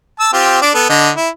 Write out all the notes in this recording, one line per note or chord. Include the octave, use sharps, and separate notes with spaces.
A5 E6
C4 F4 G4
D4 D6
B3 A4
D3 D#5
E4